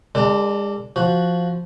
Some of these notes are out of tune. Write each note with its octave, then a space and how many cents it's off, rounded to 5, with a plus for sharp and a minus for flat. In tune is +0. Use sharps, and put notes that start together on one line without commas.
G#3 -40 D4 -10 A4 +40
F3 +0 F#4 +0